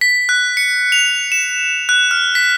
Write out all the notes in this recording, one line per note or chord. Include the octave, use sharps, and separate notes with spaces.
B6
F#6
C#7
F7
E7
F#6
F6
B6